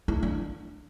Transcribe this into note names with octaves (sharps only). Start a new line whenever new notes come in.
E4
D4